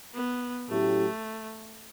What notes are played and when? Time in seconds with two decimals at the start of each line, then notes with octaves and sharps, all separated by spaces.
0.14 B3
0.69 A2 F#3 A3 C#4 E4 G4